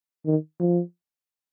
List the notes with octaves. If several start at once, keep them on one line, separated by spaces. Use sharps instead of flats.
D#3
F3